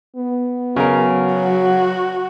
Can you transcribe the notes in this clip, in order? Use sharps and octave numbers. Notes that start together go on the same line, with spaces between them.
B3
C#3 F#3 A#4
F#4